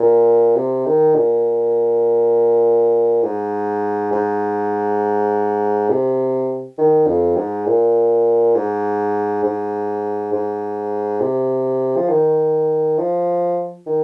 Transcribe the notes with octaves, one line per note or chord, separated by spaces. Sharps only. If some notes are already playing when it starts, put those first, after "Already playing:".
Already playing: A#2
C3
D#3
A#2
G#2
G#2
C3
D#3
F2
G#2
A#2
G#2
G#2
G#2
C3
F3
D#3
F3
D#3